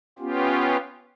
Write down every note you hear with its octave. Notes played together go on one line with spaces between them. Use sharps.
B3 C#4 F4 G4